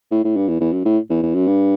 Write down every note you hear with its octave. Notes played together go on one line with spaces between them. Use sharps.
A2
A2
G2
E2
E2
F#2
A2
E2
E2
F#2
G2